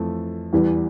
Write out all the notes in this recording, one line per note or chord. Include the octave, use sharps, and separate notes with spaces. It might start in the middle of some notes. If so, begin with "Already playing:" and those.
Already playing: F2 E3 A3
E2 E3 G3